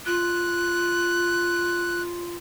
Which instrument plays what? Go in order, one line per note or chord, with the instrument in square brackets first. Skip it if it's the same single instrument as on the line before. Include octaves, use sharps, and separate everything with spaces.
[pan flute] F4 [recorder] F#6